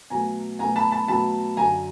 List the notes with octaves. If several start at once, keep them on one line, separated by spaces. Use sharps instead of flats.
B2 F#3 A3 G#5 A#5
B2 F#3 A3 G#5 A#5
A5 B5
A5 B5
B2 F#3 A3 A5 B5
F#2 D3 F#3 G#5 A#5